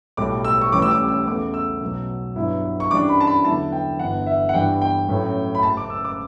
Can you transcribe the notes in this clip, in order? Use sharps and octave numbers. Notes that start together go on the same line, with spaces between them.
B1 A2 G3 D6
E6
C#6
A1 A2 E3 G3 C#4 D6
E6
D6
E6
E2 C#3 E3 A3 D6
E6
B1 B2 F#3
G2 F#3 B3 E4
C#6
F#2 E3 G3 D4 D6
B5
A5
B5
E2 D3 F#3 B3 E4 A5
G5
G1 G2 E3 F#5
E5
F#5
G2 E3 G3 B3 D4 G5
G5
A1 A2 F#3 C#4
B5
F#1 F#2 C#3 A5
D6
E6
D6